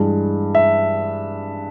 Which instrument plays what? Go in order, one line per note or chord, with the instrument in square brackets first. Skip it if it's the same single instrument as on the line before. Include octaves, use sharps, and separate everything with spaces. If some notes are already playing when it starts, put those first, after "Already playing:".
Already playing: [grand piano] G2 E3 G#3
E5